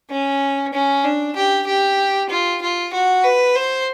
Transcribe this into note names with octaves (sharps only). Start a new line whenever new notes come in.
C#4
C#4
D4
G4
G4
F4
F4
F#4
B4
C5